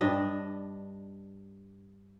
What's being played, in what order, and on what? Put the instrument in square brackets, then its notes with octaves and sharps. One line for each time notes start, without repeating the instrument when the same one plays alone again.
[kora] G2 D4 D#5